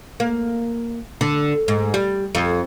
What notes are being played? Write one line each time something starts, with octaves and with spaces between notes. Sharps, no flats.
A#3
D3
G#2
G3
F2